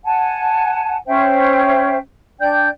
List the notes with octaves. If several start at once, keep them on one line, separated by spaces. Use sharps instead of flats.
F#5 G#5 A5
C#4 C5 E5 G5
D4 D5 G5 G6